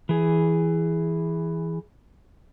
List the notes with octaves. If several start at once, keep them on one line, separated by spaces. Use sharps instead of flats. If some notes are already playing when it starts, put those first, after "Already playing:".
E3 G#4